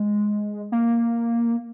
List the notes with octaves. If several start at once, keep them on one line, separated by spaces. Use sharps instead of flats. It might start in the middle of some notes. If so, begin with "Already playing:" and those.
Already playing: G#3
A#3